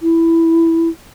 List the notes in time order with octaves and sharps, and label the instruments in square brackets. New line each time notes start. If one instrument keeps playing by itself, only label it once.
[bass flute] E4